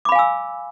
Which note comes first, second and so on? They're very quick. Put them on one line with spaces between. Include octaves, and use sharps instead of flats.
D6 B5 F5 G#5 E6